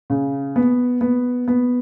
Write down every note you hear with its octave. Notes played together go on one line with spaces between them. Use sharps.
C#3
B3
B3
B3